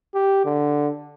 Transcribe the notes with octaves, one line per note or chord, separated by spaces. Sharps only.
G4
D3